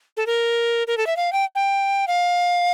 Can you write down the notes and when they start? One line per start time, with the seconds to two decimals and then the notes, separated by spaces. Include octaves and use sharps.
0.17 A4
0.27 A#4
0.87 A#4
0.98 A4
1.07 E5
1.17 F5
1.33 G5
1.55 G5
2.08 F5